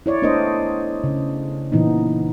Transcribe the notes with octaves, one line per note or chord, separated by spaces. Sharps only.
E4 C#5 D5
A3 B3 D4 A#4 C5 D#5
C#3
A#2 E3 B3 D#4